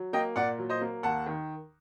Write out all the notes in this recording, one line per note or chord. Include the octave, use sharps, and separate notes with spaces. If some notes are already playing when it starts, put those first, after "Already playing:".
Already playing: F#3
A#3 D#5 G5
A#2 D5 F#5
F#3
C5 D#5
A#3
D#2 F#5 A5
D#3